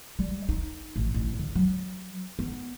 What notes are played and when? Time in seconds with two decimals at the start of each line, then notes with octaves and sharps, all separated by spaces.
0.19 G3
0.49 D#4
0.96 A1
1.14 A1
1.39 D3
1.56 F#3
2.39 B3